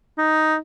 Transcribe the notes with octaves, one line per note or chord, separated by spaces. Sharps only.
D#4